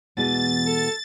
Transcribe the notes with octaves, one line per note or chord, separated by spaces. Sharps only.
E2 B2 E3 G#3 A6
A4